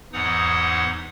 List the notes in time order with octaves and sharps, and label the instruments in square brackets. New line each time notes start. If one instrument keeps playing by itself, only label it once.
[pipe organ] E2 G#2 E3 D#4 F#5 D#6